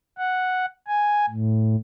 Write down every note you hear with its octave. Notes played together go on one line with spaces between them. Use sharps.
F#5
G#5
A2